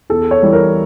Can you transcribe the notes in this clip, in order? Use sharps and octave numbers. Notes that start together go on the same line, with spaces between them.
E2 A4
C#5
E3 G3
A#4